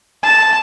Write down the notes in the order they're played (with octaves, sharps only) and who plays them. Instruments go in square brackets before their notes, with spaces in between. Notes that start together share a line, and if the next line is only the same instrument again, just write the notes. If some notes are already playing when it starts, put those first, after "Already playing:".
[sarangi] A5